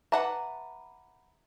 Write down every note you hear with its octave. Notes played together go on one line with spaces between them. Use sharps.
B4 E5 F#5 A5 A#5 D6